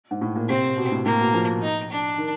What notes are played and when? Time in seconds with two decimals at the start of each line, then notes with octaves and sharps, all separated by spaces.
0.11 G#2
0.21 A2
0.36 A#2
0.49 C3 C4
0.77 B2
0.92 A2
1.05 A2 A#3
1.20 B2
1.34 F3
1.62 D#4
1.90 D4
2.18 D#3